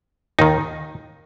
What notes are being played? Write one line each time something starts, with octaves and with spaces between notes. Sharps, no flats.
D#2 D#3 D#4